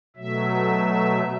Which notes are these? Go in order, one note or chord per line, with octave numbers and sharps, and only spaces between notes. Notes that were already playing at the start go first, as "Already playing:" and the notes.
B2 F#3 A3 E5